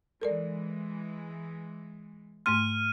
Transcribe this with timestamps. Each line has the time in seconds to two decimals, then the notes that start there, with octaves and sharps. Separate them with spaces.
0.22 E3 G#3 A4 A#4 D5
2.46 G#2 A3 C6 F6 D#7